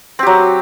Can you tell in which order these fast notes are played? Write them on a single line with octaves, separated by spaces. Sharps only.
C4 G4 F#3